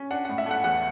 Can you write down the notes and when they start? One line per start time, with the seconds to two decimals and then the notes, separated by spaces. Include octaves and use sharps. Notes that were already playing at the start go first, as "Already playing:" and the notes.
Already playing: C#4
0.11 D4 F#5
0.25 F#5
0.29 A2
0.38 E5
0.46 A3 F#5
0.64 E2 F#5